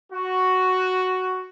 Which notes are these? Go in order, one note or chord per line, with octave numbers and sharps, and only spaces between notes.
F#4